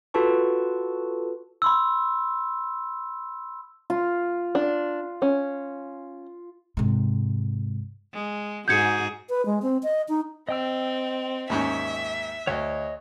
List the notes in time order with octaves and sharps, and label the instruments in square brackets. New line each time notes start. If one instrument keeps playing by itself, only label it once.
[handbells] F4 F#4 A4 B4 A5 C#6
[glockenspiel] B5 C6 E6
[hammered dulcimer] F4
[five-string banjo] D4
C#4
[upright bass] G#2 C3
[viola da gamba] G#3
[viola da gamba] G#2 F#4 G#4 [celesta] G6 G#6 C#7
[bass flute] B4
G#3
C4
D#5
D#4
[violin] C4 [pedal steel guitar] D#5 G5 E6
[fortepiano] D#2 G#2 C#4 [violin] E5
[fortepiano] D2 [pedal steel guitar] C#5 D#5